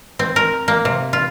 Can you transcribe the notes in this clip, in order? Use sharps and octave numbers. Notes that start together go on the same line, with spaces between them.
C4
A#4
A#3
C3
F4